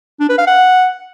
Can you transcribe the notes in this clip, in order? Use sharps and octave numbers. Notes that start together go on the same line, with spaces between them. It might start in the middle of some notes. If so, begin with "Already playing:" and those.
D4
B4
F5
F#5